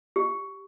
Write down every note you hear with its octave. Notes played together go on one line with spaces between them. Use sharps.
G4